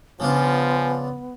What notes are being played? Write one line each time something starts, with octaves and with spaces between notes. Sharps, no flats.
C#3 F3 B3 D4 F4 G#5